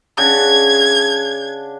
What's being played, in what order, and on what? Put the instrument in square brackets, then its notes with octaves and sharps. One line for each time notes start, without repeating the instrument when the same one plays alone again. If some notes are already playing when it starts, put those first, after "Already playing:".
[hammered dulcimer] C#3 D4 F#5 [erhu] G#6